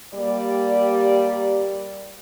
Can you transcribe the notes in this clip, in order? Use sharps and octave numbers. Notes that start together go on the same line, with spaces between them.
G3 A#3 G4 D5